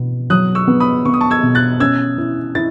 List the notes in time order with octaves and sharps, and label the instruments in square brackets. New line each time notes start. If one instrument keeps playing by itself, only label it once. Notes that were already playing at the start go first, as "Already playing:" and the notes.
Already playing: [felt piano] B2 B3
[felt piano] F#3 [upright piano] D#6 F#6
[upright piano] C#6 E6
[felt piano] B3
[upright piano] B5 D#6
[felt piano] B3 [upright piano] C#6
[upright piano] D#6
A5 C#6
E6 G#6
[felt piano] B2
[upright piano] F#6 A6
[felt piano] C#4 [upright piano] E6 G#6
[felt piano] E4
[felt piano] E4 [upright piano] A6